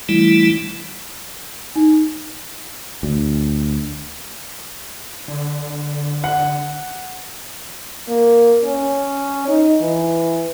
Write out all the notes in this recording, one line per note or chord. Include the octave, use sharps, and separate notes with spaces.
E3 G3 A3 E4
D#4
D2
D3
F#5
A#3
C#4
D#4
E3